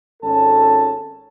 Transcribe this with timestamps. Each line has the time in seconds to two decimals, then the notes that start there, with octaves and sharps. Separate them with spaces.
0.23 G#1 C#4 A4 A5